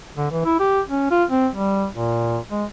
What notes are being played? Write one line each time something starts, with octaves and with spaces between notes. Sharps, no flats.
D3
E3
E4
G4
C#4
F4
C4
G3
A#2
G#3